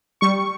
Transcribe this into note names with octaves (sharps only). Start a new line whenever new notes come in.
G3 C#6